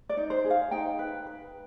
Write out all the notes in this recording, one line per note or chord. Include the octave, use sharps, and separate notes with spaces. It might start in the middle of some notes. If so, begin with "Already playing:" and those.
D5
D#4
C5
G#4
F5
D#4 G5
B4
B4